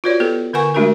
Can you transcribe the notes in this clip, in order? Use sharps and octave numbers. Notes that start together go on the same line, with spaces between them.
F4 F#4 B4 C#5 D5
B3 G4 A4 B4
D3 A#4 B4 F#5 G#5 C#6
G#3 A3 D4 F#4 G4 A#4